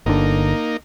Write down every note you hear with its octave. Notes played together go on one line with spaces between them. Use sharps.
G1 D3 A#3 D#4